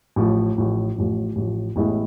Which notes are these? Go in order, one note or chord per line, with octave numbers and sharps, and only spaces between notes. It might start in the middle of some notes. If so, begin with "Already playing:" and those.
A1 A2 F3
A1 A2 F3
A1 A2 F3
A1 A2 F3
A1 A2 G#3 B3 E4